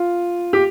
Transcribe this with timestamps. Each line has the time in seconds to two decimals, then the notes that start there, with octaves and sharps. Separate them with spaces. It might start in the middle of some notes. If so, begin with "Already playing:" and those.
Already playing: F4
0.53 G4